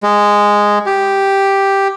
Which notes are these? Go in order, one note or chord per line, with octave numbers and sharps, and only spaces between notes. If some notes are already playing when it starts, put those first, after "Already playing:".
G#3
G4